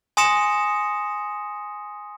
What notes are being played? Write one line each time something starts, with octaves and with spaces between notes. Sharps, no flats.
G#5 C6 D#6 A#6 C#7 E7